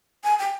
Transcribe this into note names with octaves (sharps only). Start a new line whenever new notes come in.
G#5
G5